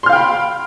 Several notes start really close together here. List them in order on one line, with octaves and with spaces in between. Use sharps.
C6 F6 F5 G5 B5